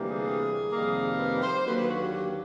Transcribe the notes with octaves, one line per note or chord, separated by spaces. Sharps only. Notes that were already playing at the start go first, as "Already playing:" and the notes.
Already playing: D2 C3 E3 G3 A#3
G#4
F2 C3 D#3 G3 A#3
B4
C5
D#2 D3 F#3 A#3 B4
B4
F#4
G4
G4